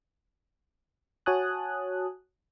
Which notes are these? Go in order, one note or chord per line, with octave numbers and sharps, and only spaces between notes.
F#4 C#5 G#5 A5 D#6 F#6